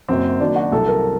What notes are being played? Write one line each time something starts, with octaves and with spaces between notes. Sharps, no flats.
F#1 F#2 F#3 C4
F#1 F#2 D#3 D4
F#4
C2 C3 F#3 A4
A#4